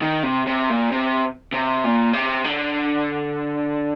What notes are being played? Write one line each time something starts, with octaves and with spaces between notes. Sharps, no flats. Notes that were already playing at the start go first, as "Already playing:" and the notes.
D#3
C3
C3
A#2
C3
C3
A#2
C3
D3